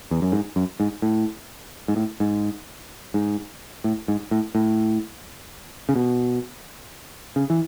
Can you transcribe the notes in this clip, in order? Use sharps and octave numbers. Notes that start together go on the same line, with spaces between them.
E2
F#2
G#2
F#2
G#2
A2
G#2
A2
G#2
G#2
A2
G#2
A2
A2
C#3
B2
C#3
E3